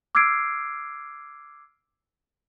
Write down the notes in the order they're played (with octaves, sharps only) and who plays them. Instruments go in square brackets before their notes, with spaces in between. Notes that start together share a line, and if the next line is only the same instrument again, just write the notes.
[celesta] D6 E6 F6 G#6 C7 D7